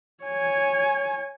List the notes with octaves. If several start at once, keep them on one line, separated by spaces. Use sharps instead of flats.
C#5 G#5